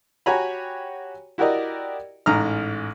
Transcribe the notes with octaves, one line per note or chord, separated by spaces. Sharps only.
F#4 G4 C#5 G#5 A#5 B5
E4 F#4 G4 A#4 D5 D#5
A1 G#2 A#5 D#6 F6